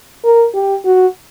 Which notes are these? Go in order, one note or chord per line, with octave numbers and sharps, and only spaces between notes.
A#4
G4
F#4